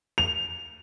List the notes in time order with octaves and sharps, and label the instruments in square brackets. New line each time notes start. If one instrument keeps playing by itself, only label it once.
[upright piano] F7